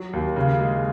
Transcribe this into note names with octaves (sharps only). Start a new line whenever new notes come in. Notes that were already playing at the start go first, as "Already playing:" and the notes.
Already playing: F#3
D#2
C#3
G#3